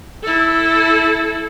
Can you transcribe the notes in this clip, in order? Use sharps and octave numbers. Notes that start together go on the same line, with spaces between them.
E4 A4